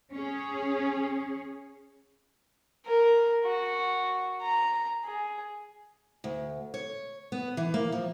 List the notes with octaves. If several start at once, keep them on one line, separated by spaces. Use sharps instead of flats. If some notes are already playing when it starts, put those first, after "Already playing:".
C#4 G#4
A#4
F#4
A#5
G#4
D2
C#5
B3
E3
A#3
F3